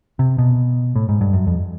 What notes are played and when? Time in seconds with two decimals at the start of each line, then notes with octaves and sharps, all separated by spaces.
0.19 C3
0.38 B2
0.96 A2
1.09 G#2
1.21 G2
1.33 F#2
1.47 F2